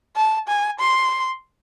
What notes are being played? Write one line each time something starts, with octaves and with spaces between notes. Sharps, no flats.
A5
G#5
C6